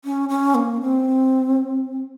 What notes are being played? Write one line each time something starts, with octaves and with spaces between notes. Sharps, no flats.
C#4
C#4
A#3
C4